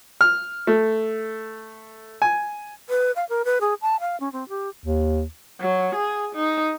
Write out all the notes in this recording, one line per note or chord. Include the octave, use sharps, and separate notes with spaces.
F6
A3
G#5
B4
F5
A#4
B4
G#4
A5
F5
C#4
C4
G4
D#2
F#3
G#4
D#4